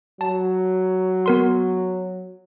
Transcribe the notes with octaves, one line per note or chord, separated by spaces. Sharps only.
F#3 A5
B3 A#4 C6